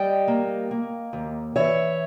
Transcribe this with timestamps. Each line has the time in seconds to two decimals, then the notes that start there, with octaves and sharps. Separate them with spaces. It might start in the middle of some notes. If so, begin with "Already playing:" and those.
Already playing: G3 D#5 G5
0.28 A#3
0.71 A#3
1.13 D#2
1.56 E3 C#5 E5